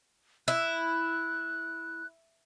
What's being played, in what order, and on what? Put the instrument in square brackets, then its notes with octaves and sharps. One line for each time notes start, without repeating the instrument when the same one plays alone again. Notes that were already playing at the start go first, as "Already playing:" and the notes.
[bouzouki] E4 [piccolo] F#6